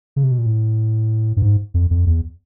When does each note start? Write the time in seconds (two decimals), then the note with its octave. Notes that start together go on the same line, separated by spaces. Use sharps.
0.16 C#3
0.23 C3
0.31 B2
0.38 A#2
0.46 A2
1.37 G2
1.42 G#2
1.74 F2
1.91 F2
2.06 E2